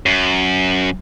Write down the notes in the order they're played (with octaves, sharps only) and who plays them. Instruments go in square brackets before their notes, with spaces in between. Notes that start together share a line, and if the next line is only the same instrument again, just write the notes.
[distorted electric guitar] F#2